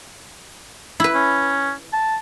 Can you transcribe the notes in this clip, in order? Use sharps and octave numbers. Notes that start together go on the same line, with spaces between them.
E4 B4
C#4
A5